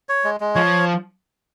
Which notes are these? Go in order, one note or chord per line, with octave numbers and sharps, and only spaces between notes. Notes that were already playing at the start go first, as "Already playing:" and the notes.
C#5
G#3
G#3
F3 C#5